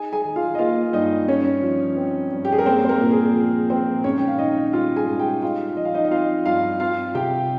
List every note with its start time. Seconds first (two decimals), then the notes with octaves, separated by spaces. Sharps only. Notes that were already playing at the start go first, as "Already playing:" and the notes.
Already playing: D#4 G#4 G#5
0.13 G#4 G#5
0.25 D#3
0.36 F4 F5
0.55 D#5
0.59 A#3 F4 F5
0.93 G2 D#4 D#5
1.28 C#4 D#4 C#5
1.62 F3
1.96 C4
2.32 G2
2.45 G4
2.52 G#4
2.59 A#4
2.66 A#3 C4 C5
2.85 C5
2.89 A#3 A#4
3.00 A#2
3.12 G#4
3.35 F3
3.70 A#1 C4 C5
4.04 G#2 C#4 C#5
4.18 G5
4.28 F5
4.38 D#3 D#4 D#5
4.73 G3 F4 F5
4.96 G#4 G#5
5.07 G#2
5.19 G4 G5
5.42 D#4 F4 F5
5.77 F3 D#5
5.85 F5
5.94 D#4 D#5
6.05 D#5
6.11 C4 F4 F5
6.46 G2 F4 F5
6.80 C4 F4 F5
7.15 C3 G4 G5